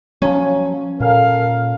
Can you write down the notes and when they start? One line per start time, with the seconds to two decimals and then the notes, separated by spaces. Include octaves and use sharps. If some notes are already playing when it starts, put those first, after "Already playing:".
0.22 F3 F#3 C#4
1.00 A#2 A4 A#4 F5